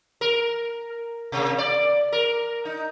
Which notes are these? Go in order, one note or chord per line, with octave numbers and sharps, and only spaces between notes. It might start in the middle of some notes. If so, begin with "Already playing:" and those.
A#4
C3 A#3
D5
A#4
D#4